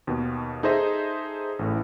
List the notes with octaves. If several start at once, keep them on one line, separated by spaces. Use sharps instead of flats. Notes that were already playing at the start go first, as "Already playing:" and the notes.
D#2 B2
D#4 G#4 A4 C5 D#5 E5
A1 A2